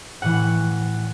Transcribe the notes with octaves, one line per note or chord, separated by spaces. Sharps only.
A2 E3 F#5